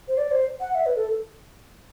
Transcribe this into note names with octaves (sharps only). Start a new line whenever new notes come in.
C5
D5
C5
F#5
E5
B4
A4